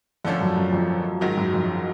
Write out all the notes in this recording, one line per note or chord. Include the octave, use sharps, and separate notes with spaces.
F2 D3 F3 A3 C#4
F#2
F#2
F2
G#2 D#3 F#3
F#2
F2